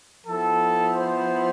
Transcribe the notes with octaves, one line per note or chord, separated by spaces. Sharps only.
F3 B3 E4 A4
C5